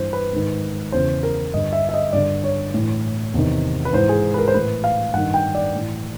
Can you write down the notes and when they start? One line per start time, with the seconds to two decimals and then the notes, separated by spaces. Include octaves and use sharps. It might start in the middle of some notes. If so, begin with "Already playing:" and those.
Already playing: G2 E3 C5
0.13 B4
0.33 G#2 D#3
0.92 E2 C#3 E3 C5
1.23 A#4
1.54 G2 D3 D#5
1.73 E5
1.89 E5
1.94 D#5
2.13 G2 D3 D5
2.44 C#5
2.74 A2 E3
3.34 E2 C3 D#3
3.85 B4
3.93 G#2 E3 C5
4.09 G#4
4.34 B4
4.38 A#4
4.48 C5
4.54 A2 E3 B4
4.84 F5
5.14 G2 D#3 F#5
5.34 G5
5.55 D5
5.75 A2 E3